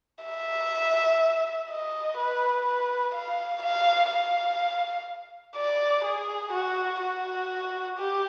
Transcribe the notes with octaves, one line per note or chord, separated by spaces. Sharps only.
E5
D#5
B4
B4
F5
F5
F5
D5
G#4
F#4
F#4
G4